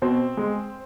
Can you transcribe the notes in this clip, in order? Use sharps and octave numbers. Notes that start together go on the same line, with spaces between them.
B2 C4 C5
G#3